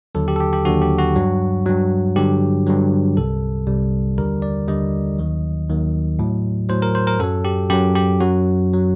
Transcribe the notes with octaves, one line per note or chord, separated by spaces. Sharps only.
D#2 D3 F#3 A4
G4
A4
G4
G4
D#2 D3 F#3 F#4
G4
F#4
G2 F#3
G2 F#3
G2 D3 F#3 G4
G2 D3 F#3
C2 C3 G3 A4
C2 C3 G3
D#2 D3 G3 A#4
D5
D#2 D3 G3 D#5
D#2 D#3 F#3
D#2 D#3 F#3
A2 F#3
A2 F#3 C5
A#4
C5
A#4
F#2 F#3 A4
G4
F#2 F#3 G4
G4
F#2 F#3 F#4
F#3